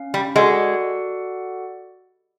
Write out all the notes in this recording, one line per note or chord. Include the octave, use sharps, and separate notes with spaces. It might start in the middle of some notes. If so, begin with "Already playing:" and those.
Already playing: C#4 F5
G3
G#3 F#4 A4 D5 F#5